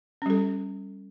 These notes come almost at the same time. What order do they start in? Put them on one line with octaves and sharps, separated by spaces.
C#4 G3 A4